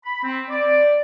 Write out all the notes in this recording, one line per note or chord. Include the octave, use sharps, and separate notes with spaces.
B5
C4
D5